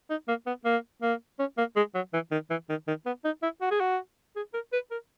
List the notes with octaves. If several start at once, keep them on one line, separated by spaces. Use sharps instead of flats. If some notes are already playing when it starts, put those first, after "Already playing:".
D#4
A#3
B3
A#3
A#3
C#4
A#3
G#3
F#3
E3
D#3
E3
D#3
D#3
B3
D#4
E4
F#4
G#4
F#4
G#4
A#4
B4
A#4